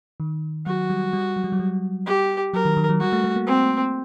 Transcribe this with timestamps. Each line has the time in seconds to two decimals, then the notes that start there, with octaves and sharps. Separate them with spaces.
0.20 D#3
0.66 F#3 F#4
0.90 G3
1.13 G3
1.36 F#3
1.44 G3
1.52 F#3
1.59 G3
2.06 G4
2.53 F#3 A#4
2.65 D#3
2.77 D#3
2.89 F#3
3.00 G3 F#4
3.13 A3
3.24 A3
3.36 A#3
3.47 C4